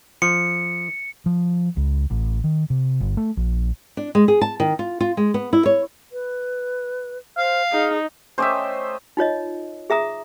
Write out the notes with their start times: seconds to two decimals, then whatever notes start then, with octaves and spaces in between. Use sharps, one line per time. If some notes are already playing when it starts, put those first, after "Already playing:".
0.22 F3 C#7
1.26 F3
1.77 C#2
2.10 A1
2.44 D#3
2.70 C3
3.01 G1
3.17 A3
3.37 A#1
3.97 D4
4.15 G#3
4.28 G#4
4.41 A5
4.60 D#3
4.79 F4
5.00 F4
5.17 G#3
5.34 B3
5.53 E4
5.66 C#5
6.13 B4
7.38 C5 F5
7.72 D#4 G#4
8.38 A3 C#4 G4 C5 D#5 E5
9.17 D#4 F4 C#5 D#5
9.90 G#4 E5 A#5 D#6